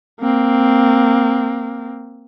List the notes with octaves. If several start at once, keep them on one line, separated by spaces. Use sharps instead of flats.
A#3 C4